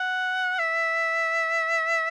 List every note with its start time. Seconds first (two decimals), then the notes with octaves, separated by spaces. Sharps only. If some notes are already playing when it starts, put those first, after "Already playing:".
Already playing: F#5
0.59 E5